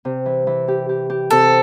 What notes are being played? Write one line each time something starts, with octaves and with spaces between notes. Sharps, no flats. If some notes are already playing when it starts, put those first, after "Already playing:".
C3
E3
E3
G4
G4
G4
C3 A4